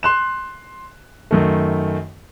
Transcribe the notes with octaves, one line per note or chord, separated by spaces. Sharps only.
C6 F#6 E7
F#2 D#3 A3